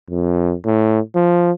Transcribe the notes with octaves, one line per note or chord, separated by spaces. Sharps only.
F2
A2
F3